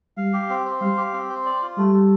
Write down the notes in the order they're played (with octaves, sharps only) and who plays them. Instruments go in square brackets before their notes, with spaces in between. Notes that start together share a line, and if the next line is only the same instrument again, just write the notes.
[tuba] G3 [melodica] F5
[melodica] G4
C4
C5
[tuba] G3 [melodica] F5
[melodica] G4
C4
C5
D5
F4
[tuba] G3 [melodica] A3
[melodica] A4